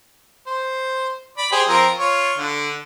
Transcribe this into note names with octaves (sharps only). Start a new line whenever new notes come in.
C5
D5 B5
G4 G#4 C5
F3 C4 A#4
F4 C#5
D3